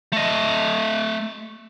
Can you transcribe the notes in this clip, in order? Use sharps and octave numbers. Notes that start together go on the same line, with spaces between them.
A3 D#5